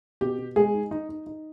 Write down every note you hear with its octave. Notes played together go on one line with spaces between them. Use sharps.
B2 G4
B2
G#3 G#4
D#4
D#4
D#4
D#4